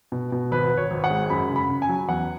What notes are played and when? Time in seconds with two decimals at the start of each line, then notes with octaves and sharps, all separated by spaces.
0.12 B2
0.32 B2
0.51 G#1 B4
0.71 G#1
0.77 C#5
0.91 G#1
1.04 F#5
1.10 G#3
1.30 F#2 B5
1.49 C#3
1.56 B5
1.69 C#3
1.82 G#5
1.89 F#3
2.08 E2 F#5